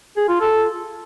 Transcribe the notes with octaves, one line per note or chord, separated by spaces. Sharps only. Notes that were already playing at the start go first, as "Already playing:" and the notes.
G#4
F4
A4